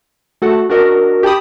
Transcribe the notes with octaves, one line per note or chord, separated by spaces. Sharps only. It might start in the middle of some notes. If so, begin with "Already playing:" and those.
A3 F#4 A4 F#5
D4 F#4 A#4 D#5
G4 G5 A5 B5 D#6